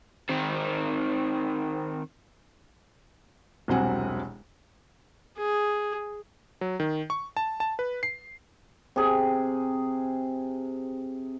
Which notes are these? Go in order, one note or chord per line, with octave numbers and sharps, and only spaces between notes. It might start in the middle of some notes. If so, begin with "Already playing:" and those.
D#3 C4
E1 C2 F#3 C4 F#5 G#5
G#4
F#3
D#3
C#6
A5
A5
B4
C7
C3 G#4